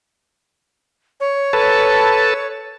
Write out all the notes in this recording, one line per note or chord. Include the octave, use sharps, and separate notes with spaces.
C#5
A4 B4 A5